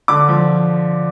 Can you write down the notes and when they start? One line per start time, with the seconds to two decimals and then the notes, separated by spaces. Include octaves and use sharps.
0.08 D3 D6
0.28 F3